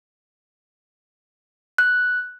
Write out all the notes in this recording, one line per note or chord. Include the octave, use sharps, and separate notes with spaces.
F#6